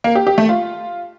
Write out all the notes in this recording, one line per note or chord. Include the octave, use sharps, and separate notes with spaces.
A#3
G4
G4
A3
F4